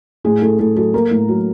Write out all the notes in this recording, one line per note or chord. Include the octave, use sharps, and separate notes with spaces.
A2 G#4
A2 A4
A2 A4
F#3 A4
A#3 A#4
A2
F#3